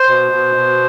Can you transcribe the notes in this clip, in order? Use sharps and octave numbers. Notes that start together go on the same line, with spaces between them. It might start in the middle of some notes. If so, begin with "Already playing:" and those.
Already playing: C5
B2
B2
B2